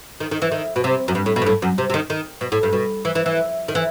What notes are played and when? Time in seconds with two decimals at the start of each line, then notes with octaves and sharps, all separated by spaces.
0.20 D#3
0.31 D#3
0.42 E3
0.52 D#3
0.76 B2
0.84 C3
1.08 F#2
1.15 G2
1.26 A2
1.36 B2
1.42 G2
1.47 A2
1.62 F#2
1.78 C3
1.90 C3
1.94 D#3
2.10 D#3
2.41 B2
2.52 A2
2.63 G2
2.73 B2
3.05 E3
3.15 E3
3.26 E3
3.68 D#3
3.75 E3